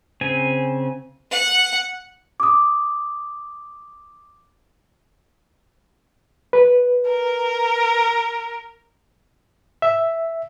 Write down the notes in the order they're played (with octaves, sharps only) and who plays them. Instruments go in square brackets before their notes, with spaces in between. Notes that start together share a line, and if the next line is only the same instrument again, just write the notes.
[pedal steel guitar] C#3 C4 G#5
[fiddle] F#5
[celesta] D6 D#6
[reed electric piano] B4
[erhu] A#4
[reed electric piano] E5